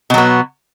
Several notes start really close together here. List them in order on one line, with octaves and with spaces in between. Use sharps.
B2 F#3 B3